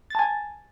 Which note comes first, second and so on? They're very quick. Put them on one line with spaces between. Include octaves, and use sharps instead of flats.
A6 A5 G#5